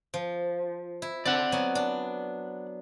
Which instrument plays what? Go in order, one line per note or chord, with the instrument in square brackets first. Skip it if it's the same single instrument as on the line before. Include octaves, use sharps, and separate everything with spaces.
[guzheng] F3
E4
[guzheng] C4 [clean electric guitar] D5 F#5
[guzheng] F#3 B3 G#5
D4